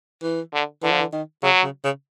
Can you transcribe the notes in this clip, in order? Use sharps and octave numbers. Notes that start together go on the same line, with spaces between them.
E3
D3
D3 E3
F3
E3
D#3
C#3 F#3
C#3
C#3